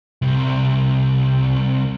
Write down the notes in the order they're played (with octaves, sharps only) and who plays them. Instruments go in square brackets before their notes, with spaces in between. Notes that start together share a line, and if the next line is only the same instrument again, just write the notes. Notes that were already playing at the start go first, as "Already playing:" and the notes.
[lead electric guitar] C2 C3